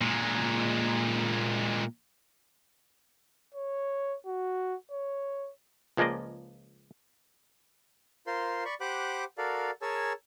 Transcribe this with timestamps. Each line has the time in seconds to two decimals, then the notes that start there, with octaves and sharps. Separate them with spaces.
0.01 A#2 G#3
3.54 C#5
4.26 F#4
4.92 C#5
5.97 C#2 F3 G#3 A#3 D5 D#5
8.27 F4 A#4 C5 C6
8.65 D5 B5 C#6
8.81 G4 C5 F#5 B5 D6 F#6
9.38 F#4 A4 A#4 D5 F5
9.82 G#4 A#4 C#5 G#5 A5 E6